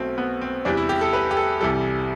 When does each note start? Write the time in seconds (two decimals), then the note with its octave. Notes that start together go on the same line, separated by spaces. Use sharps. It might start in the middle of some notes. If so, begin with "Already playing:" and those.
Already playing: B1 B2 A3 C4
0.18 B3
0.41 C4
0.65 E2 C3 E3 G3 D4
0.77 E4
0.89 G4
1.01 A4
1.13 B4
1.31 G4
1.37 A4
1.61 C2 C3 E3 G3 A4